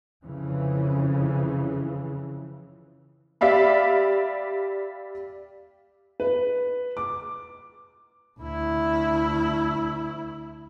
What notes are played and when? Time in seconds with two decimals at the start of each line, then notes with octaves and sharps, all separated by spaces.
0.24 F2 C#3 E3
3.41 G4 D5 E5 F5 B5
6.20 B4
6.97 D6
8.40 D2 E4